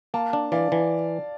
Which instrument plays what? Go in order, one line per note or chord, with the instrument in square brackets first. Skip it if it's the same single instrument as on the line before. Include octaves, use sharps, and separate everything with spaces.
[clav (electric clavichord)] A#3 [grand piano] F5 A5
[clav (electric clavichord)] D4
[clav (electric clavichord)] E3 [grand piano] D5 F5
[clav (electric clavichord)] E3